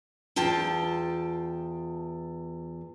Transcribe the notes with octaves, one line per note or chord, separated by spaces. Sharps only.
E2 F4 G5 A5